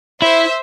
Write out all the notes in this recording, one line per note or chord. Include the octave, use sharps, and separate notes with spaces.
E4 C5 E5